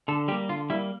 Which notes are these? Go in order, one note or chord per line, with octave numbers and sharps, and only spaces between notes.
D3 A4
G3 A#3 G4
D3 F4
G3 A#3 E4